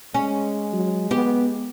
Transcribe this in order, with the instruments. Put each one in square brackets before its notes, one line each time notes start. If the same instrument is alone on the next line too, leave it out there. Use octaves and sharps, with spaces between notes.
[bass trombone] G#3 [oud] C#4
[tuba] F#3
[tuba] B3 [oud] G4